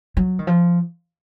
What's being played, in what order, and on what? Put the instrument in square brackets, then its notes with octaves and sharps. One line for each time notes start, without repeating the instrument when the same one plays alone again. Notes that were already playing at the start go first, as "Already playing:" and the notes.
[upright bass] F#3
D#3
F3